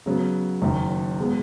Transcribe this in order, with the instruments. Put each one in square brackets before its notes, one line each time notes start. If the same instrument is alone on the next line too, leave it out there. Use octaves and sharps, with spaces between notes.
[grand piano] C#3 F#3 B3
F#1 F#2 D#3
B2 G#3 B3